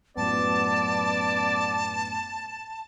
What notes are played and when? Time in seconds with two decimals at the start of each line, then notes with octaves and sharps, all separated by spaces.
0.17 F#2 A2 F#3 B3 D5 A5